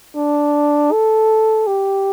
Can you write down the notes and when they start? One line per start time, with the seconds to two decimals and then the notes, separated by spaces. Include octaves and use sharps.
0.16 D4
0.92 A4
1.67 G4